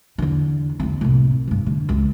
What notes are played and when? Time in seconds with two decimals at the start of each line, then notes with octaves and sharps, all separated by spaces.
0.18 E2 D3
0.80 E2 C4
1.01 C2 A2
1.48 G2 E3
1.66 D3
1.89 C#2